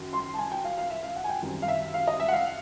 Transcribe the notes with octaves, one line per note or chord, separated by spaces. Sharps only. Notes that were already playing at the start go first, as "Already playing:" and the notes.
Already playing: F#2 D#3
C6
A5
G#5
G5
F5
F5
E5
F5
F#5
G#5
G5
F#2 D#3 G3 C4
F5
E5
F5
D#5
E5
F#5
F5